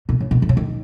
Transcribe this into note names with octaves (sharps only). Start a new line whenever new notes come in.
B2
C#3
B2
D#3
C#3
D#3